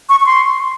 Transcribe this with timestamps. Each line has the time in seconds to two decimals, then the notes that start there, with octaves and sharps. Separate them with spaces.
0.09 C#6
0.20 C#6
0.26 C6